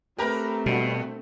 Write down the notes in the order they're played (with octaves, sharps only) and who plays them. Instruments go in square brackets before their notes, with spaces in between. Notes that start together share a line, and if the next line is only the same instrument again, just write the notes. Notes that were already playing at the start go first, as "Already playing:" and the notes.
[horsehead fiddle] A3 C4 [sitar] G4 A#4 [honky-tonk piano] B4 A#5 B5
[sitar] G2 [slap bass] B2 [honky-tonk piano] G3 F#4